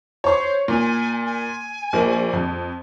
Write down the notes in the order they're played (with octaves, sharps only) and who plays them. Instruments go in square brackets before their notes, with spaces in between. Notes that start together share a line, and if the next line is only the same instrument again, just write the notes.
[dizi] C5 [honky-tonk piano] C#5 C#6
[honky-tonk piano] A#2 [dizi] G#5
[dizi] G#5
[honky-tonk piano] A#1 A#3
F2